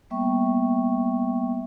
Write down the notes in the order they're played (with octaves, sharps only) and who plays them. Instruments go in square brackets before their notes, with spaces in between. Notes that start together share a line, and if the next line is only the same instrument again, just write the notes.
[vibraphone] G3 A#3 B3 E5 G5 C#6